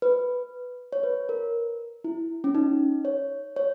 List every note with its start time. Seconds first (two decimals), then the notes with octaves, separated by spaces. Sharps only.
0.02 B4
0.93 C#5
1.03 B4
1.29 A#4
2.04 E4
2.44 C#4
2.55 D#4
3.05 C#5
3.56 C#5